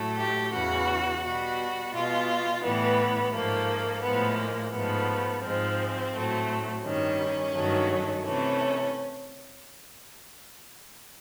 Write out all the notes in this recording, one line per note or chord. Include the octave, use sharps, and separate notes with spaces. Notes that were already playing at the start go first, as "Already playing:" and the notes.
Already playing: A2 F#3 A3
G4
E2 C#3 E3 F#4
B2 G3 F#4
B2 G#3 F4
A2 E3 G3 B3
G#2 F3 A3 A#3
A2 F3 G#3 B3
A#3
G#2 F3 A3 B3
G#2 F3 G#3 C4
A2 F#3 A3
G2 D#3 G3 C#4
G2 D#3 F#3 A3
C3 E3 A3 C#4